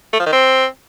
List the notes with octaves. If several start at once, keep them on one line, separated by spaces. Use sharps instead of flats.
A3
F3
D#3
C4